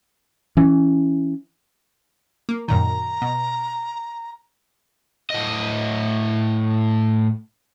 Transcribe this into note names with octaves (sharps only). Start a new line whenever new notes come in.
E3 C#4
A#3
F#2 A#2 D#3 A#5
B2
A2 D#5